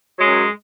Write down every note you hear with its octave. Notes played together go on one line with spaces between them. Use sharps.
F#2 F#3 G#3